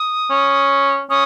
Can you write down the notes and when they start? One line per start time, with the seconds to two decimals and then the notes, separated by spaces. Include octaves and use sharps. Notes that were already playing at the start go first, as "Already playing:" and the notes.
Already playing: D#6
0.30 C#4
1.10 C#4 D#6